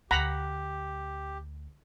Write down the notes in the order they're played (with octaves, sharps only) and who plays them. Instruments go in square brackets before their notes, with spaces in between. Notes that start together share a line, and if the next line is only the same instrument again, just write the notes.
[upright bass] D2 [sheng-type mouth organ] G4 [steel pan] F#5 A#5 B5